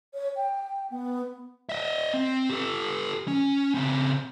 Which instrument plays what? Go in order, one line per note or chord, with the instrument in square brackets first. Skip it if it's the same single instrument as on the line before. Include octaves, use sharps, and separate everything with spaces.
[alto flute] C#5
G5
B3
[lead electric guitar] D#5 E5
C4
G4 A4
C#4
C#3 C4